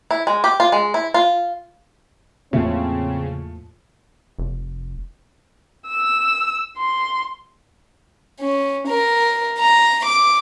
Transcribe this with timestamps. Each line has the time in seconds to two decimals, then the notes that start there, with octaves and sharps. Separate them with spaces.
0.11 E4
0.27 G#3
0.44 G4
0.60 F4
0.72 G#3
0.94 E4
1.14 F4
2.53 E2 A2 C#3 F3 A3 A#3 C4
4.39 F1
5.88 E6
6.78 C6
8.40 C#4
8.88 A#4
9.59 A#5
10.06 D6